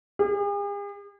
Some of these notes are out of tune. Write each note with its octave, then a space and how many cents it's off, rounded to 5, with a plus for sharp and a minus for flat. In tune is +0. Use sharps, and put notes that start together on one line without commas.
G#4 -45